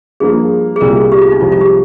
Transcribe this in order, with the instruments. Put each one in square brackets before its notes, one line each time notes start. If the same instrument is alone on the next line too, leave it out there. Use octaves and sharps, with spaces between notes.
[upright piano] G2 F3 A#3 [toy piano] G#4
[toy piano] G#4
[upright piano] C2 A#2 G3 A#3 [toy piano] A#4
[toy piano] G#4
G4
F4
D#4
[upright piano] C2 C3 F3 G#3 [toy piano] F4
[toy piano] F4
G4